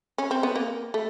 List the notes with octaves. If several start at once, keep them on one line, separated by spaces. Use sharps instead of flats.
C#4
C4
B3
A#3
A3